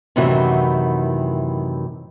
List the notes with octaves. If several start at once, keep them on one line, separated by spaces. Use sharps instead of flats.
F#2 A2 C3 D#3 E3 F#4